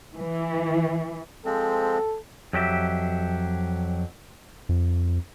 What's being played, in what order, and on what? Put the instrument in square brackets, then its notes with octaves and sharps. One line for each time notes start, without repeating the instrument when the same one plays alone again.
[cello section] E3
[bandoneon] F3 G#3 C4 [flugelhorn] A4
[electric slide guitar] F2 F#3 G4 E5
[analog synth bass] F2